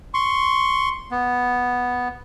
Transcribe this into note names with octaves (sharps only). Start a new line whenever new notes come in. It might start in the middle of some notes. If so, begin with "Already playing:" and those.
C6 C#6
B3